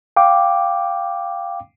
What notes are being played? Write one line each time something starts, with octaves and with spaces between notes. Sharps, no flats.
F5 G5 D6